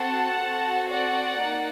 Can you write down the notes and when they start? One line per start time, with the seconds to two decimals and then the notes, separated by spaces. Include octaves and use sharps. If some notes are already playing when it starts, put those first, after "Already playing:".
Already playing: C4 F#4 A4 F#5 A5
0.40 C4 F#4 A4
0.90 D5 F#5
1.40 A#3 D#4